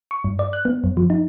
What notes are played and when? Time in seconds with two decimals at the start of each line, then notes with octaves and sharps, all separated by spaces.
0.11 C#6
0.24 G2
0.39 D5
0.53 F#6
0.65 B3
0.84 F#2
0.97 F3
1.10 D#4